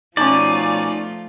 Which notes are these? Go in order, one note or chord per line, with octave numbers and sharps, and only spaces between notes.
B2 F3 A3 C#4 D#4 F4 D5